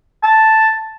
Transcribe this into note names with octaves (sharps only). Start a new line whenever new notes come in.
A5